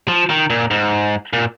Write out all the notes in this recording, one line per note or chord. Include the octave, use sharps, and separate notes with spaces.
F3
D#3
A#2
G#2
A#2